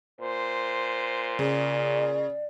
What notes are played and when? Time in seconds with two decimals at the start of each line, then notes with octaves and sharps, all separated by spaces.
0.21 A#2 C5
1.39 C#3 D5